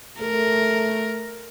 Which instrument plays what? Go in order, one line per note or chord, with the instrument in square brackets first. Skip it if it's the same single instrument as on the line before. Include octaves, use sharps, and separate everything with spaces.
[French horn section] A3 [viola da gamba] A#4